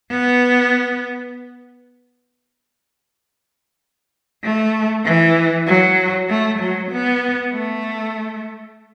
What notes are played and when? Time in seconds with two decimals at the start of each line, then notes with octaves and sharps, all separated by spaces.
0.11 B3
4.43 A3
5.05 E3
5.67 F#3
6.29 A3
6.59 F#3
6.91 B3
7.53 A3